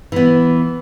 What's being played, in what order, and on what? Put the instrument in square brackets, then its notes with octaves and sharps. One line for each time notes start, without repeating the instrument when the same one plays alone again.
[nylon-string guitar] E3 B3